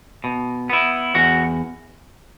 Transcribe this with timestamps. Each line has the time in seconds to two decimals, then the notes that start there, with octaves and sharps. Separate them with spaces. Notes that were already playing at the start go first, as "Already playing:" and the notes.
0.24 B2
0.70 B3 E4
1.15 E2 F#4